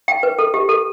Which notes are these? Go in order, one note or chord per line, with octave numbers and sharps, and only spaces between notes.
G5
B4
A4
G4
A4